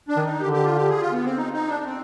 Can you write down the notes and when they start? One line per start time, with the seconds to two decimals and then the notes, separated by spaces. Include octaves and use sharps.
0.08 D4
0.17 D#3
0.25 D#4
0.40 D3 G4
0.53 G4
0.65 F4
0.76 G4
0.89 G#4
1.01 F4
1.12 B3
1.25 C4
1.36 D#4
1.53 D#4
1.68 D4
1.84 C4